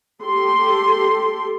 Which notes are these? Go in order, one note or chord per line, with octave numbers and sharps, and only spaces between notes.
G4 A4 C6